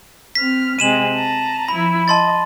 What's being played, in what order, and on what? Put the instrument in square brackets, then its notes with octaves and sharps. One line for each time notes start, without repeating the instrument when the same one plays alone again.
[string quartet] C4 F6 [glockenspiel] B6
[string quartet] C3 G#3 C4 [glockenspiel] D#7 E7 F#7
[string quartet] A5 A#5
[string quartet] F3 E4 [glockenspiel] B5
[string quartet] D#5 [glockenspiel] A5 C6 A6